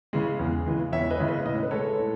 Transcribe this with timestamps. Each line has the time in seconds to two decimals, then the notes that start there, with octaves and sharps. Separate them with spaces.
0.13 C#3 E3 G#3
0.39 E2
0.66 C#3 E3 G#3
0.92 E2 C#5 E5
1.10 B4 D#5
1.19 C#3 E3 G#3
1.28 B4 D#5
1.46 A2 D#5
1.55 C#5
1.63 B4
1.71 G#3 A4 C#5
1.99 A2